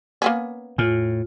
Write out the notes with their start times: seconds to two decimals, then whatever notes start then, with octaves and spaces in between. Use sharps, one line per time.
0.22 A#3 B3 C#4
0.78 E2 A2 F4